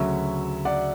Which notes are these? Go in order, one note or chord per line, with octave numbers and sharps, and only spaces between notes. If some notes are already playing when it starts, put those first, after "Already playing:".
Already playing: D2 C#3 F#3 C#4 E5
D5 F#5